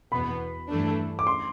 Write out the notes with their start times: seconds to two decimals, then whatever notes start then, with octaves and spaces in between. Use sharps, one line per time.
0.12 E2 B2 B3 B5
0.68 G2 E3 A3 D4
1.19 D6
1.27 C6